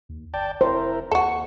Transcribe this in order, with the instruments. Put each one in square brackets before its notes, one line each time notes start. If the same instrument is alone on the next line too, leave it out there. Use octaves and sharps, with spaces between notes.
[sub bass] D#2
[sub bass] G1 [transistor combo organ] D5 G5 A5
[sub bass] F1 [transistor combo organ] E4 A#4 [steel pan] C5
[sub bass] D#2 [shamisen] F#4 A4 [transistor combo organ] C#6